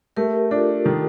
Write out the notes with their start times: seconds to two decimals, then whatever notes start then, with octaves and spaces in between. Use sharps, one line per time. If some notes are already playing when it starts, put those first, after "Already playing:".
0.16 A3 G4 A#4
0.51 D4 F4 A4
0.85 D#3 D#4 G4